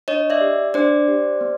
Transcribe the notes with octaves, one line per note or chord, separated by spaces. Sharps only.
D4 C#5 D#5
D5 E5
G4
D4 C5 D5
G4
B3